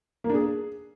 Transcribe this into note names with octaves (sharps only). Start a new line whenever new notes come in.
A#3
D4
G#4